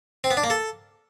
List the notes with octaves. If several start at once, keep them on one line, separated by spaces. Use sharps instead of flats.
C4
B3
D4
A#3
A4